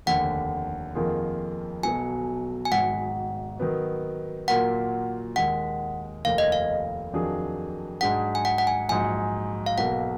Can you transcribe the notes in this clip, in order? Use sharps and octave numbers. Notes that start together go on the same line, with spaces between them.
F1 D#2 D3 F#5
F2 D#3 A#3 F4 G#4
B1 B2 F#3 G#5
G#5
G#1 G#2 F#3 F#5
D#3 F#3 B3
A#2 F#3 A#3 F4 A#4 F#5
D#2 D#3 G#3 F#5
F1 D#2 D#3 F5
D#5
F5
F2 D#3 F#3 D4 G#4
G#2 F#3 D4 G#4 F#5
G#5
F#5
F#5
G#5
A#1 G#2 F#3 G#5
F5
B1 B2 A#3 F#5